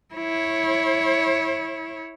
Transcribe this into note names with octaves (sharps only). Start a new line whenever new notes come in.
E4 C#5